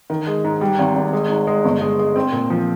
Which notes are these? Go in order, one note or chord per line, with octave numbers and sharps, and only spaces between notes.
D#3
G#3
G#2
G3
G#1
G#1
G#3
G#2
G#3
G1
G#3
G#3
C4
A#2
F3